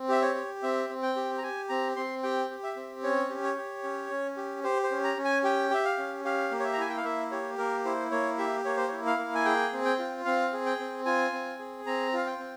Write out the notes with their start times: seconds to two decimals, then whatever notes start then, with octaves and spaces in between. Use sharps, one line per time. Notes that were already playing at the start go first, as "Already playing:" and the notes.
Already playing: C4
0.09 G4 E5
0.22 C#5
0.35 G4
0.63 C4 E5
0.90 C4
1.02 G5
1.16 G4
1.38 A#5
1.43 G4 G#5
1.69 C4 A#5
1.96 C4 C6
2.23 G4 G5
2.50 G4
2.63 E5
2.76 C4
3.03 C#4 C#5
3.30 G4
3.43 C#5
3.57 G4
3.84 C#4
4.11 C#4
4.37 G4
4.64 G4 C5
4.83 C5
4.91 C#4
5.04 A#5
5.17 C#4
5.24 G#5
5.44 G4 G5
5.70 G4 E5
5.85 F5
5.98 C#4
6.25 G4 F5
6.51 A#3
6.60 C#5
6.64 E5
6.73 A#5
6.78 E4 G#5
6.89 G5
6.97 F5
7.04 A#3 E5
7.31 G4 C#5
7.58 A#3 A#4
7.85 E4 C5
8.11 A#3 C#5
8.38 G4 E5
8.65 A#3 C#5
8.77 C5
8.88 E4 C#5
9.06 F5
9.19 A#3
9.35 G#5
9.45 G#4 G5
9.73 C4
9.85 G5
9.99 F4
10.25 C4 F5
10.53 G#4
10.66 G5
10.79 C4
11.05 F4 G#5
11.33 C4
11.59 G#4
11.86 C4 A#5
12.13 F4 F5
12.27 G5
12.39 C4